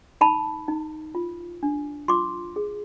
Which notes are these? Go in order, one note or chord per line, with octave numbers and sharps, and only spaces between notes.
D#4 A5 B5
D#4
F4
D4
F4 C6 D6
G#4